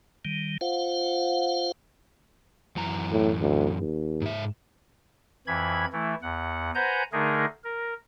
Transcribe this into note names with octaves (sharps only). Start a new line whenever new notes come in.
D#3 G3
F4 C5 F5 F#5
F#2 E3 A#5
A2
D2
D#2
G#2 E5
F2 E3 B5 G#6
E3 A3 E4
E2 F#5
B4 C5 F#5 G#5 A#5 G6
D3 A3 D#4 G#4 A#4
A#4